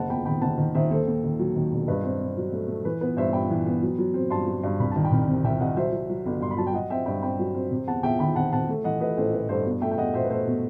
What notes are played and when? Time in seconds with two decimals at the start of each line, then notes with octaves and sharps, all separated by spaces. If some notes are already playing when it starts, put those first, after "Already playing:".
Already playing: F#1 F#5 A5
0.09 E2 G5 B5
0.25 D#3 G5 B5
0.41 F#1 F#5 A5
0.58 D#3
0.74 D#3 C5 E5
0.90 D#2 A4 C5
1.07 D#2
1.24 D#3
1.39 F#3
1.56 D#3
1.71 E1
1.87 G2 B4 D#5
2.03 C4
2.20 C4
2.37 F#3
2.52 A3
2.68 A3
2.85 E3 B4
3.01 B3 B4
3.17 G2 C5 E5
3.33 G2 G5 B5
3.50 E3
3.66 B3
3.82 F#3
3.99 F#3
4.14 C4
4.30 G2 A5 C6
4.46 F#3
4.63 G2
4.79 C2 B5
4.91 D#3 A5
5.04 G5 B5
5.11 C2
5.28 C3
5.44 C2 E5 G5
5.60 C2 D#5 F#5
5.77 F#3 C5 E5
5.93 F#3
6.10 F#3
6.26 G1
6.41 G2 C6
6.51 B5
6.58 F#3 A5
6.67 G5
6.73 F#3 D#5 F#5
6.90 C4 E5 G5
7.06 G2 G5 B5
7.22 C4 G5 B5
7.39 F#3
7.55 C4
7.71 C3
7.87 E2 F#5 A5
8.03 E2 E5 G5
8.19 D#3 G5 B5
8.35 C3 F#5 A5
8.52 C3 F#5 A5
8.69 A3
8.84 E3 D#5 F#5
9.00 A3 B4 D#5
9.17 A1 A4 C5
9.33 A3 B4
9.49 G2 A4 C5
9.66 B2
9.81 A3 E5 G5
9.91 G5
9.98 E2 D#5 F#5
10.14 B2 C5 E5
10.24 B4
10.30 A3 A4 C5
10.47 B2